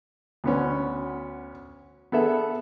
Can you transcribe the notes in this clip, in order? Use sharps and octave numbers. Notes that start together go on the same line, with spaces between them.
D2 B3 C#4
B3 G#4 A4 E5